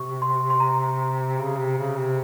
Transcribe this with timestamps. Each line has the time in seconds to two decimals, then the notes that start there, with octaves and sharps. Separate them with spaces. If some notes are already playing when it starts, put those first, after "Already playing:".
Already playing: C3 C#6
0.22 C6
0.50 C6
0.60 A#5
1.38 C#3
1.58 C3
1.78 C#3
1.98 C3